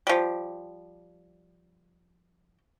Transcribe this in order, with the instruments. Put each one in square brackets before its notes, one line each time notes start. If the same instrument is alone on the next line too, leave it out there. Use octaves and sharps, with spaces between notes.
[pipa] F3 G3